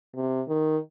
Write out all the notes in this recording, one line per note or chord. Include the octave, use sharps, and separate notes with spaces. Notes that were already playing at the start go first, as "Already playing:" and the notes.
C3
D#3